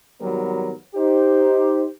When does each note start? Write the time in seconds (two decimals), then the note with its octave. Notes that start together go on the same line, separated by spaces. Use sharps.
0.22 G#1 F#3 G3 B3 A#4 B4
0.95 D#4 G4 C5